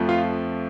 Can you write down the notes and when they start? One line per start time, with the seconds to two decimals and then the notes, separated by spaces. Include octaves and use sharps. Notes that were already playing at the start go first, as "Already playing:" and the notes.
Already playing: F2 F3 A3
0.09 F4 F5